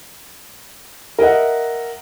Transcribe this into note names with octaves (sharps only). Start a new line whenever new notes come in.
A#4 D#5 E5 F#5